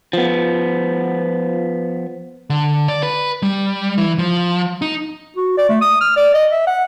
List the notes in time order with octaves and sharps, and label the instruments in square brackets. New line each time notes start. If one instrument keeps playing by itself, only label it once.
[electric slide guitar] F3 B3
[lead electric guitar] D3
D5
B4
G3
E3
F3
D#4
[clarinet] F#4
D5
A3
D#6
F6
D5
D#5
E5
F#5